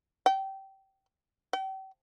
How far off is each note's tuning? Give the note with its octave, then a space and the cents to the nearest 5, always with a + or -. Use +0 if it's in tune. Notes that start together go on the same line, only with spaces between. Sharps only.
G5 -20
G5 -40